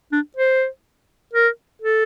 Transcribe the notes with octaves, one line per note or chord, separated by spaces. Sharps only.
D4
C5
A#4
A4